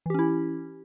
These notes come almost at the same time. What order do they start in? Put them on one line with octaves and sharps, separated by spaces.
E3 G4 C#4 E4